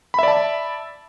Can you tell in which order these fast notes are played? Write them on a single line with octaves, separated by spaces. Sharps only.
B5 E5 D5 A5